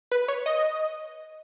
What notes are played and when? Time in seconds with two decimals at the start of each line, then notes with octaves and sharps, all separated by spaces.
0.11 B4
0.28 C#5
0.46 D#5